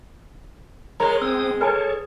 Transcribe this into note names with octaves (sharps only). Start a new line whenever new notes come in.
G#3 A#4 C#5 A#5
C4 D#6 E6
A4 B4 C#5 G#5 A5